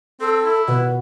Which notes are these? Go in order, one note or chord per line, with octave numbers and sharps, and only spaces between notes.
C4 A4
E4
B2 B4